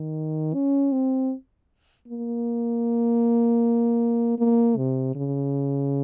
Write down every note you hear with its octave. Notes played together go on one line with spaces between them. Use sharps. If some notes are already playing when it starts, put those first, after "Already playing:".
Already playing: D#3
C#4
C4
A#3
A#3
C3
C#3